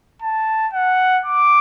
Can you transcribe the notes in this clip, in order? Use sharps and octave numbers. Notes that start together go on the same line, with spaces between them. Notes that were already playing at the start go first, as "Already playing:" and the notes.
A5
F#5
D6